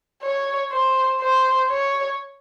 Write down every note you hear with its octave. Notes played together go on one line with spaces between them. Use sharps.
C#5
C5
C5
C#5